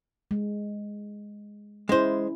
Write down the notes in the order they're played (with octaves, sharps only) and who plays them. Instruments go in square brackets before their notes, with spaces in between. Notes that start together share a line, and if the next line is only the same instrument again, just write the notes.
[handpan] G#3
[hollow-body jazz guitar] G#3 C5 [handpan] C#4 E4